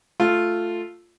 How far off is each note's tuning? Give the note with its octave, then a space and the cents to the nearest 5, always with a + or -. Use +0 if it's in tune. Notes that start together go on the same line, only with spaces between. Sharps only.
A3 +0 F4 +0